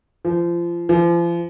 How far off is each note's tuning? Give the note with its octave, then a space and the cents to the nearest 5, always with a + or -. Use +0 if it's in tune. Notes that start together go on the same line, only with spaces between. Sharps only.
F3 -30
F3 -40